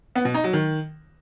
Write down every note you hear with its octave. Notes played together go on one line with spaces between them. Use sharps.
B3
B2
D#4
F#3
D#3